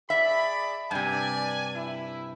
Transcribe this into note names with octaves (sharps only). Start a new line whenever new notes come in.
G#4 D5 E5 B5
G2 C3 D5 G#5
E4